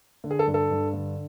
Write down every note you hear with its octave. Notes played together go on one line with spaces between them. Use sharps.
D3
G#4
A4
G2
A4
G2
D3